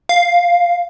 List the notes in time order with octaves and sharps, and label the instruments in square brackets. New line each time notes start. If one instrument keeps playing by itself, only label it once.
[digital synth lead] F5